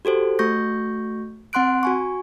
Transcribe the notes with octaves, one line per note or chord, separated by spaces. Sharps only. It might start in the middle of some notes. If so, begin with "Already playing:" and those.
F#4 G4 A4 C5
A3 F#4 C#6 G6 A#6
C4 F#5 C6 F#6 D7
F#4 G#5 C#6